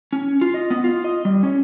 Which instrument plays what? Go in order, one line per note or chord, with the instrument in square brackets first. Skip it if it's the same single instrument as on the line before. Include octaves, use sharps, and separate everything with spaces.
[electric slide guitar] C#4
F4
D#5
B3
F4
D#5
G3
C#4